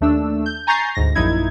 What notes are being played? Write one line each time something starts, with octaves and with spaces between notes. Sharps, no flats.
D#2 A3 D4 E6
G6
G#5 A#5 C#6 G6 A6 C7
D2 G#2 A#6
A#1 F#2 D#4 E4 G#6